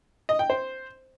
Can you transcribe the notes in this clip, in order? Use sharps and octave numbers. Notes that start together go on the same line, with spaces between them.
D#5
G5
C5